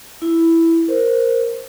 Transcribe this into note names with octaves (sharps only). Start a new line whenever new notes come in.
E4
A#4 C5